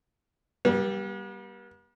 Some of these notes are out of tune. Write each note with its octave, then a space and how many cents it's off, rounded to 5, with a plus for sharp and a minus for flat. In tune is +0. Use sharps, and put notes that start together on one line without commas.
G3 +0 B3 -45